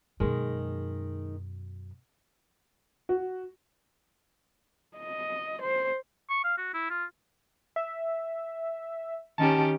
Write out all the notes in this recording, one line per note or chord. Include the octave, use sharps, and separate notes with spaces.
F#2 B2 D#3 G#3
F#4
D#5
C5
C#6
F5
F#4
E4
F4
E5
D#3 C#4 G4 A5